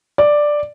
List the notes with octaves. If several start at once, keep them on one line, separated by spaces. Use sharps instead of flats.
D5